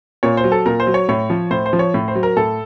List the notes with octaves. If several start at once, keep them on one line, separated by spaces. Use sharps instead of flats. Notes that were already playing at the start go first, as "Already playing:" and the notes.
A#2 C#5
C5
F#3
A4
A#2 A#4
C5
F#3
C#5
A2 C#5
F3
A2 C5
C5
F3
C#5
A2
C5
F#3
A#4
A2 A4